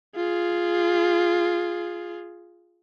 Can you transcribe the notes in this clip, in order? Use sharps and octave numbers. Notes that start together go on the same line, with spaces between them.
F4 G#4